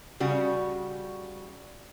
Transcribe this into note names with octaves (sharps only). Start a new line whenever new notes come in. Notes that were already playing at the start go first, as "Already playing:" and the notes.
C#3 G3 F#4